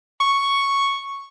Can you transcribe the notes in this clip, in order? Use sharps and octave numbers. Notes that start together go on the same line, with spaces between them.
C#6